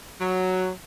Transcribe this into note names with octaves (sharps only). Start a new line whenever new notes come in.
F#3